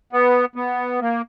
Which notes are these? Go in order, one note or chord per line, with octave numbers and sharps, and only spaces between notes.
B3
B3
A#3